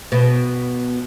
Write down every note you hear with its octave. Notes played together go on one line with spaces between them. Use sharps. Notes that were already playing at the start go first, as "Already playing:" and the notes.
B2